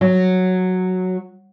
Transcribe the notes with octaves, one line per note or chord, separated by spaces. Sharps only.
F#3